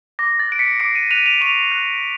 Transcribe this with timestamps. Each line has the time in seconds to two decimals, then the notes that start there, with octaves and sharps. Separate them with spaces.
0.19 D6 A#6
0.39 A6
0.49 F#6 D7
0.59 B6 C#7
0.80 D6 C7 D7
0.95 C#7 D#7
1.11 F#6 D#7 F7
1.26 D#7 F7
1.41 C#6 D#7 F7
1.72 F#6